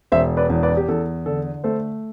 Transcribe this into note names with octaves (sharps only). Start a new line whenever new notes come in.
E1 C5 E5
B4 D5
E2
B4 D5
G4
E2 A4
D3 A4
A3 A4 C5